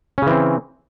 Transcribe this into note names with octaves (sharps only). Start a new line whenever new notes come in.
C#3 E3 C4 C#4